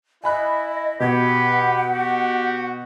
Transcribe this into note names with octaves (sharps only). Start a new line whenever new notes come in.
E4 D#5 G#5 B5 F#6
B2 G4 B4 F#5 G#6
F#4 G4